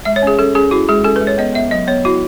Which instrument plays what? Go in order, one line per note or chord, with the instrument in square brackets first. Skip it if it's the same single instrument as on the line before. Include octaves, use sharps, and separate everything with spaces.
[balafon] G#3 E5
C#5
C#4 G#4
C#4 A4
C#4 G#4
E4 F#4
G#3 G#4
C#4 A4
B4
G#3
C#5
B3 D#5
B3 E5
F#3 D#5
B3 C#5
E4 F#4